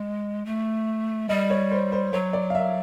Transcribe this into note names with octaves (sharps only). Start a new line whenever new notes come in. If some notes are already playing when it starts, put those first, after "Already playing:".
Already playing: G#3
A3
G3 D#5
C#5
C5
C5
F#3 C#5
D5
F5
E5